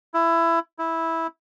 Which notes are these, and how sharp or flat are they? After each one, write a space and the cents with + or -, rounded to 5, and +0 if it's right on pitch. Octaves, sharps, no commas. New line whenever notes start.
E4 +15
E4 -10